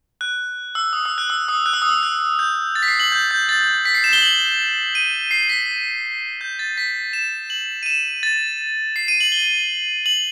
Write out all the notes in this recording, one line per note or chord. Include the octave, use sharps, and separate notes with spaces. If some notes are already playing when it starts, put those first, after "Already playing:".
F#6
E6
D#6
E6
F#6
E6
D#6
F#6
E6
D#6
E6
F#6
G6
A6
B6
C7
F#7
G6
G6
A6
B6
C7
E7
G7
F#7
D#7
C7
B6
G6
A6
B6
E7
F#7
D#7
E7
A6
C7
D#7
F#7
G7
F#7